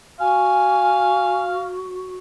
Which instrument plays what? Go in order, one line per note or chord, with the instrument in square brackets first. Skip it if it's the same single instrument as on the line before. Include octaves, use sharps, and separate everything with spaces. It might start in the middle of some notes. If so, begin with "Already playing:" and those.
[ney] F#4 [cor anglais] F5 [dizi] G#5